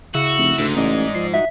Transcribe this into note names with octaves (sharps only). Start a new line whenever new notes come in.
C#3 E4 F#4 E6
F1
D2 G#2
A1 D5 D#5
F3 C7
D#4 F#4 E5